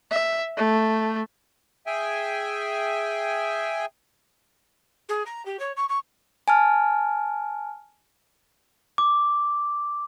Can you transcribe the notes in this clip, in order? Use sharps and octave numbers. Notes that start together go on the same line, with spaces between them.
E5
A3
G#4 E5 G5 G#5
G#4
A#5
G4
C#5
C#6
C#6
G#5 A5 F6
D6